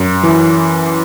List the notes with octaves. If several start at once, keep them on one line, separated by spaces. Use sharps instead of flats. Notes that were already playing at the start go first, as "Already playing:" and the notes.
Already playing: F#2
E3